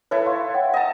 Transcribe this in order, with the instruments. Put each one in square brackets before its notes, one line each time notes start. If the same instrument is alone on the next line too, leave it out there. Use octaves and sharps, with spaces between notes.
[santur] E4 A4 B4 [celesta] C#5
[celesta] F5 C6 C#6
C#5 F#5 G5
[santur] D#5 A5